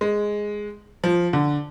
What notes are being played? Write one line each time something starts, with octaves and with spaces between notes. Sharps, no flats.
G#3
F3
D3